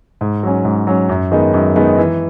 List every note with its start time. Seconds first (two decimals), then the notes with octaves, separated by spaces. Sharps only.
0.21 G#2
0.43 F#3 C#4
0.65 G#2
0.87 F#3 C#4
1.09 F#2
1.31 D#3 G#3 B3 D#4
1.54 F#2
1.76 D#3 G#3 B3 D#4
1.98 E3